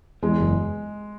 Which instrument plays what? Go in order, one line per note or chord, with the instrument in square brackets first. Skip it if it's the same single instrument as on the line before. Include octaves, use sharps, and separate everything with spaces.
[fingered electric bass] E2 [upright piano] G#3
[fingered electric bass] F#1